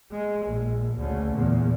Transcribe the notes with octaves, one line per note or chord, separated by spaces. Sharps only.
G#3
A#1
D2 C#3
E2 A#2